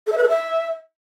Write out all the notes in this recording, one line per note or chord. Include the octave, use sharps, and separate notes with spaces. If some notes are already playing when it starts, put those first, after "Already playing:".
A4
E5
B4
A4
E5